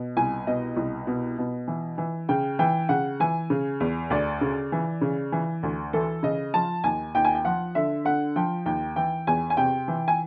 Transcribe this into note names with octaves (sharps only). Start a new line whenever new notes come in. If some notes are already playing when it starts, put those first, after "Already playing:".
Already playing: B2
C2 G#5
B2 D#5
C2
B2
B2
E3
E3
C#3 G5
E3 G5
C#3 F#5
E3 G#5
C#3
E2
D2 D5
C#3
E3
C#3
E3
D2
E3 A4
C#3 D#5
F3 A5
D#2 G#5
D#2 G5
G#5
G5
F3 F#5
D3 E5
D3 F#5
F3 G5
D#2 G5
E3 G5
E2 G#5
G#5
C3 G5
E3
G#5